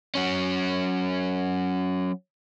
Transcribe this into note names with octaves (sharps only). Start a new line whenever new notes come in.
F#3 C#4